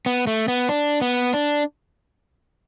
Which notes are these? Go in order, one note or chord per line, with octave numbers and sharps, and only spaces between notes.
B3
A3
B3
D4
B3
D4